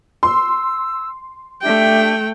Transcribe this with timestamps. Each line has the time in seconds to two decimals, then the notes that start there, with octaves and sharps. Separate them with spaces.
0.23 C6 E6
1.62 A3 D4 G4 E5 G5